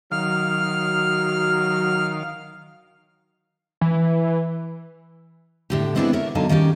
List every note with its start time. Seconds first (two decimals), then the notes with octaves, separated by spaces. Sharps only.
0.12 D#3 F#3 F5 F6
3.81 E3
5.70 A2 D3 G4
5.95 G#3 B3 C4 D4 E4 G#4
6.13 A#4 C#5 E5
6.35 E2 D3 F#3 D#4 F5 A5
6.49 D#3 G3 C#4 G4